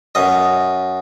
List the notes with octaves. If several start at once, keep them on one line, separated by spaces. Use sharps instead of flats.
F#2 D#5